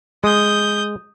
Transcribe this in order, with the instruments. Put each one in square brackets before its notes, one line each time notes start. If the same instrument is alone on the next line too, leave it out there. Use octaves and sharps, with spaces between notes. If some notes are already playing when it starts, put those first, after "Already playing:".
[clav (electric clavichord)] G#3 [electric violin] D#6 G6